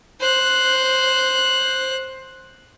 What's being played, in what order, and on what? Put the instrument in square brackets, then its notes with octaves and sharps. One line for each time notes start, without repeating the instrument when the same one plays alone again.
[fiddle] C5 F#6